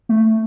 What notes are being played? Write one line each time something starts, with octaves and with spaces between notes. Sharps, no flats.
A3